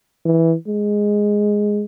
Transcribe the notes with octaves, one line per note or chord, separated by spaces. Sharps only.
E3
G#3